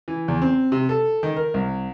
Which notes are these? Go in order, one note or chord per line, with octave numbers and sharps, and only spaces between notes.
E3
E2
C4
C3
A4
D#3
A#4
C2